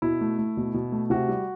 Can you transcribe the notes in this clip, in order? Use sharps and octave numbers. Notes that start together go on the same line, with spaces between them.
B2 E4
A3
A3
B2
B2
A3
C3 F#4
G3